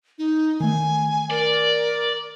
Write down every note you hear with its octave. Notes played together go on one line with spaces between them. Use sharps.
D#4
D#3 A3 G#5
A#4 D5